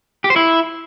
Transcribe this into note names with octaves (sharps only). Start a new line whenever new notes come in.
G4
C5
E4